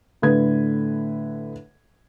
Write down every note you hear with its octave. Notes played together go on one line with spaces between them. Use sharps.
A2 D3 B4 G#6